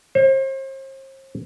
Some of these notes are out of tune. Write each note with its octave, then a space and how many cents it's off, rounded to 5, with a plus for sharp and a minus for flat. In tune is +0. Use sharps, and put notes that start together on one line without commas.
C5 +40